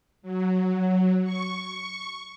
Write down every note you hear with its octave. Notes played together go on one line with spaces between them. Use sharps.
F#3
C#6